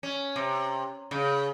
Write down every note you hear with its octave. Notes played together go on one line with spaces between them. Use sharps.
C#4
C3
C#3